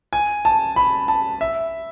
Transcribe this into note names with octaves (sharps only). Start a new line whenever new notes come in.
G#5
A5
B5
A5
E5